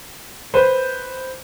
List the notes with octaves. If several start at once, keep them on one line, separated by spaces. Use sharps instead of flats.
B4 C5